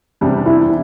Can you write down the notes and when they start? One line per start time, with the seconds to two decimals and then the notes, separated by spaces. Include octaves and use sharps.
0.21 E2 C3 G3 D4 G4
0.46 E4